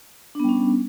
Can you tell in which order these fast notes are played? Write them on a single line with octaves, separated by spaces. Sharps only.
D4 B3 G3 C#4